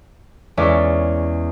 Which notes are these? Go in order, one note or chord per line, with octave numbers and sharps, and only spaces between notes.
E2 G#3 C#4 D5 E5 C#6